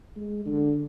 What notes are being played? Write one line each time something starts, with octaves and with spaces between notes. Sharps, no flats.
G#3
D3